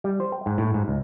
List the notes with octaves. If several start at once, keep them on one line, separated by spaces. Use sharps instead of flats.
G3
C5
G5
G#2
A2
G#2
C#2